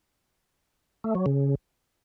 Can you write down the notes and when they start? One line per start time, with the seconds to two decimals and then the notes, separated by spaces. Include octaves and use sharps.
1.04 A3
1.15 F#3
1.26 C#3